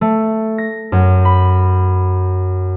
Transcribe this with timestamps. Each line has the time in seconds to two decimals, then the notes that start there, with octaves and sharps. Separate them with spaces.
0.01 A3
0.58 A#6
0.92 F#2
1.25 B5